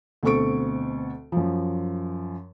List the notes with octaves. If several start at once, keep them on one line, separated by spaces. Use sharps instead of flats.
D2 B2 C4 A4 C#6 D7
F#2 F3